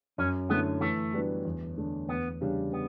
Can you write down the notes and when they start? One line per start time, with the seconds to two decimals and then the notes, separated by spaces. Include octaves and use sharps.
0.18 F#2 C#4
0.49 D3 A3 B3 E4
0.81 E3 A3
1.14 G3 B3 D4 F#4
1.45 E2
1.77 D3 A3 D4
2.09 E2 B3
2.41 C#3 G3 D4 G4
2.73 B3